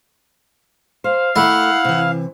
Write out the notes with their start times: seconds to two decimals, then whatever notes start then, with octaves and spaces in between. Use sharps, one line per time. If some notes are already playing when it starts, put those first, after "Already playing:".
1.04 C5 F5
1.36 A3 E4 A#4 E5 F#5
1.85 C3 E3